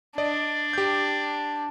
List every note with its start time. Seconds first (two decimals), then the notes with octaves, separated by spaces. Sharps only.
0.18 D4 D5 D#5
0.73 G4 G6